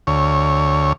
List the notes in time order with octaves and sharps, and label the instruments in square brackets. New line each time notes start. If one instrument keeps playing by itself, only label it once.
[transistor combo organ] D2 C#5